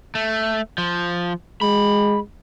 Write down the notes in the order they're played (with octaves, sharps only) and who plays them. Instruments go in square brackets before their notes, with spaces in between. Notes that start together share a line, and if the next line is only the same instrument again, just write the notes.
[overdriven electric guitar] A3
F3
[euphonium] G#3 [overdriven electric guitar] B5